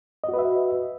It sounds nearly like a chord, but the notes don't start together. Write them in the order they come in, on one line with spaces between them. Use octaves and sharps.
D#5 F#4 B4 E5